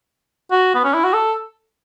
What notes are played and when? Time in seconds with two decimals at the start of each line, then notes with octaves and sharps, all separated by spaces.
0.51 F#4
0.75 B3
0.84 C#4
0.94 E4
1.04 F#4
1.13 A4